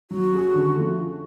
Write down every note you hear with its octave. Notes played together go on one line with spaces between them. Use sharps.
F#3 F#4
C#4 G#4
D3
F3 A3 C#4